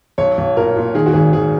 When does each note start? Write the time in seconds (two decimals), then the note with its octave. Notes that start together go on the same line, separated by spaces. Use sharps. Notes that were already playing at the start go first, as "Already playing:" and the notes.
0.18 B1 C#5
0.38 B1
0.57 A#2 A#4
0.76 A#2
0.95 D#3 G#4
1.06 F#4
1.13 G#1 G#4
1.33 G#1 G#4